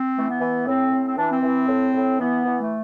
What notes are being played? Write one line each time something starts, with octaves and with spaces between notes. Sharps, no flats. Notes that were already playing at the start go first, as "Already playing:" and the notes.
Already playing: C4
E3 A3
B3
E3
A2 C4
A2
C4
E3 D4
C4
E3
A2
A2
E3 B3
E3
A3